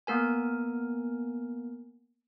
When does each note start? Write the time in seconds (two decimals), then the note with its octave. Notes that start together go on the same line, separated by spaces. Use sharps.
0.07 A#3 B3 A#4 G#5